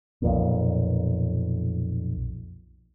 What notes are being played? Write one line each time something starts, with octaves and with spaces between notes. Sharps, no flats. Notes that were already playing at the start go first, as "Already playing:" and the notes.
B1 F2 A#2